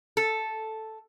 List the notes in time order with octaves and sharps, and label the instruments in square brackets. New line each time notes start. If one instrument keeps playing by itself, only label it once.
[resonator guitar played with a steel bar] A4